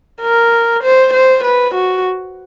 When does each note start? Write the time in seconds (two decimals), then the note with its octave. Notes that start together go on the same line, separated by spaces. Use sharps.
0.21 A#4
0.83 C5
1.13 C5
1.44 B4
1.74 F#4